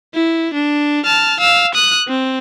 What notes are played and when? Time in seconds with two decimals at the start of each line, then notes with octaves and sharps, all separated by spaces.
0.14 E4
0.54 D4
1.05 A5 F6
1.40 F5 E6
1.75 D#6 F#6
2.08 C4